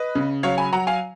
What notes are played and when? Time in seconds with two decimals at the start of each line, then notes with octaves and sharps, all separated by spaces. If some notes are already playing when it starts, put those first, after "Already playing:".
Already playing: B4 D#5
0.15 C#3
0.43 F#3 C#5 F5
0.58 G#5 B5
0.72 F#3 F#5 A#5
0.87 F5 G#5